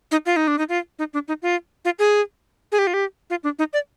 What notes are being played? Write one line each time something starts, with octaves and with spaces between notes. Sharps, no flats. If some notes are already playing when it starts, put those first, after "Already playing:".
D#4
F4
D#4
D4
D#4
F4
D#4
D4
D#4
F4
F4
G#4
G#4
G4
F4
G4
F4
D4
D#4
D5